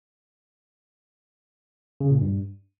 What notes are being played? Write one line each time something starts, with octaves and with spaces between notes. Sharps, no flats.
C#3
A#2
G2